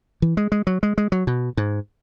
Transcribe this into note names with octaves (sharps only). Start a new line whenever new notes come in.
E3
G#3
G#3
F#3
G#3
G#3
F#3
B2
G#2